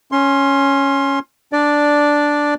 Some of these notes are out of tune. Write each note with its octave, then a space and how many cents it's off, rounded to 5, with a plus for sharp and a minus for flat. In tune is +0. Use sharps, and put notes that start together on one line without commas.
C#4 +0 C6 +20
D4 -5 D5 +0